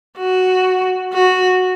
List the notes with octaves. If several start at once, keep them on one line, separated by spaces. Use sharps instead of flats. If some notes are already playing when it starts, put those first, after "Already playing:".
F#4
F#4